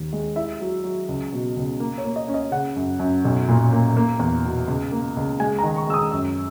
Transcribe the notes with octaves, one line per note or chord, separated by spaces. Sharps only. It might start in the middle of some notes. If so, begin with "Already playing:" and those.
Already playing: D#2
G#3
E4 E5
F#3
F#3
C#2
B2
C#2
A#3
C#5
A#3
D#5
C#4
D#5
C#3 F#5
F#2
F#2
B1
A#2
A#3
A#3
E2
B2
C#2
A#3
C#2
G#3 G#5
A#5
D#3
C#6
G#3 E6
D#6
F#2 E6